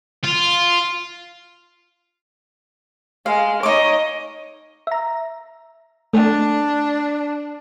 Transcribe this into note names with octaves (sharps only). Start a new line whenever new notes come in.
F4
G#3 F5
D#4 C#5 D#5 D6
E5 A#5
A3 D4